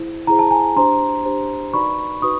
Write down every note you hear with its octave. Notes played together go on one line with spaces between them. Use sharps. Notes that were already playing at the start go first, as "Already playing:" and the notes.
Already playing: E4 G#4 C5
E4 G#4 C5 A#5
A5
G#5 A#5
D4 G4 C5 A#5 C6
D4 G4 C5
D#4 F#4 B4 D5 B5 C#6
D#4 F#4 B4 C#6 D#6